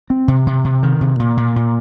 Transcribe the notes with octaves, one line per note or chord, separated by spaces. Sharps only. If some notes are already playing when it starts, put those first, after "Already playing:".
C4
C3
C3
C3
D#3
C3
A#2
A#2
A#2